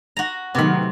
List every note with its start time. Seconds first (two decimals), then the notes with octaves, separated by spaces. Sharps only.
0.17 F#4 A#5
0.55 C3 D#3 F#3 A3 B3 B5